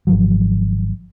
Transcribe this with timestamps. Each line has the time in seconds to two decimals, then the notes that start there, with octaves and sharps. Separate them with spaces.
0.07 G#1 F3 F#3